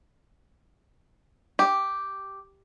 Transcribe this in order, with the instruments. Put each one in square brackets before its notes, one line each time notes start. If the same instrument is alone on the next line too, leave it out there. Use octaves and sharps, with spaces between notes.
[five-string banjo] G4